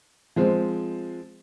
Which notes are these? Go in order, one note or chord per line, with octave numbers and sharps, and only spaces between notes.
F3 G#3 C4